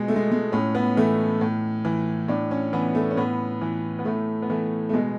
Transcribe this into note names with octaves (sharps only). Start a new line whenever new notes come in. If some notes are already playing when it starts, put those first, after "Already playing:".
Already playing: B2 G#3
A3
G#3
G#3
A2 C#4
B3
E3 A3
A2
E3
A2 D4
C#4
E3 B3
A3
C#4
A2 B3
E3
B3
A2 A3
B3
E3 A3
A3
B2 G#3